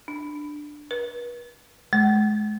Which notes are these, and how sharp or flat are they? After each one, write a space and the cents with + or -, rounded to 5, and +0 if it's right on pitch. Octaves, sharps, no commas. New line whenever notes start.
D4 +10
B4 -40
G#3 +35